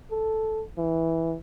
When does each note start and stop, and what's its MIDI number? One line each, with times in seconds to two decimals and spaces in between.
0.11 0.63 69
0.78 1.36 52